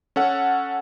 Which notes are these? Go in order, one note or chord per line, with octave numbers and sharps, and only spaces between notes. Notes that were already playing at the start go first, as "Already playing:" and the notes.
C#4 A4 F#5